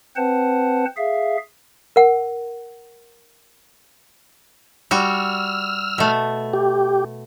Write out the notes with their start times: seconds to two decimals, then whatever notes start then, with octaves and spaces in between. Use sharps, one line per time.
0.16 C4 B4 C5 F#5 A5
0.97 G#4 E5 F5
1.96 A#4 F#5
4.91 G3 F#4 E6 F6
5.98 B2 A3
6.53 G4